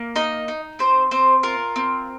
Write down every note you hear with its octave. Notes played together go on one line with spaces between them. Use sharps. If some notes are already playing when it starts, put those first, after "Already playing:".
Already playing: A#3
D#4 D#5
D#4
C4 C5
C4 C5
F4 A#4
C4